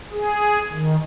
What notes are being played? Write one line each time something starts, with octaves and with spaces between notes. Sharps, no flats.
G#4
D#3